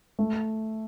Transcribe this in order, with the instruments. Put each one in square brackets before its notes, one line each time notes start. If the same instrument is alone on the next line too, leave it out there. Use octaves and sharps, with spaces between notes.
[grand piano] A3